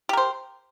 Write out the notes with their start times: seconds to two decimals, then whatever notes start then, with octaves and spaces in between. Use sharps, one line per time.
0.09 G4
0.13 A#4
0.17 C5